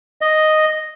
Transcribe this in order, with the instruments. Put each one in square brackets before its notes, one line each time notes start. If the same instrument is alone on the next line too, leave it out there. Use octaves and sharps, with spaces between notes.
[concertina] D#5